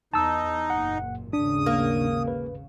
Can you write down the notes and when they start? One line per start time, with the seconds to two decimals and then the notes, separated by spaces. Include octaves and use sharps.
0.14 E2 D#4 A5 E6
0.70 F#1 A#2 F#5
1.33 G#1 D#2 C#3 D4 D#6
1.66 A#3
2.28 B4